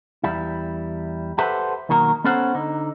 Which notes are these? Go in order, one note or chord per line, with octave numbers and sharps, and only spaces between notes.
E2 G3 E4
G4 A4 B4 C5 E5 F#5
B1 D#3 A#3 F#4 A#4
B3 C#4 A4 C5 F#5
D3 D#4